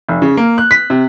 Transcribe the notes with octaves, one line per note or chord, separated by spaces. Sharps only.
F1
C#3
A#3
F#6
B6
C3